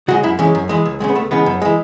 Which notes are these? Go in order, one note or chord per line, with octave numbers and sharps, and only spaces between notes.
C#3 G#3 F#4
F#2 E4
E3 G#3 C#4
F#2
E3 G#3
C#2
C#3 E3 G#3
B3
C#2 A3
C#3 E3 G#3 B3
F#2
E3 G#3